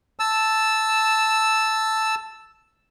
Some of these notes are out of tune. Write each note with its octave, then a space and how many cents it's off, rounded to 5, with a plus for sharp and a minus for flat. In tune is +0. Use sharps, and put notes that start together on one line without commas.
A5 +0 E6 +0